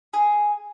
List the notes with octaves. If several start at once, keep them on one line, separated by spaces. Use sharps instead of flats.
G#4